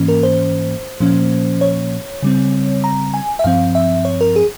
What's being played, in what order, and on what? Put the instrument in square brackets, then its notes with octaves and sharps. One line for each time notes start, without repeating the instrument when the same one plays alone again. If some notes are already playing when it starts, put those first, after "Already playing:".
Already playing: [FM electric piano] G#2 E3 A#3 C#4
A#4
C5
A#2 F3 A#3 C#4
C#5
C#3 G3 C4
A#5
G#5
E5
G2 F3 C4 F5
E5
C#5
A#4
G#4